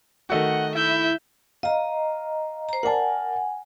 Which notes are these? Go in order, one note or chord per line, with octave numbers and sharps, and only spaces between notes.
D#3 A3 F#4 D#5 F#5
E4 E5 G6
D#5 F5 A#5
C5 A#5
A#4 D5 F#5 G#5 A5